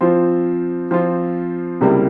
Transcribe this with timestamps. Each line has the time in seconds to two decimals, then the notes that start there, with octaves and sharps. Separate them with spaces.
0.01 F3 C4 F4
0.91 F3 C4 F4
1.81 C#2 C3 G3 A#3 E4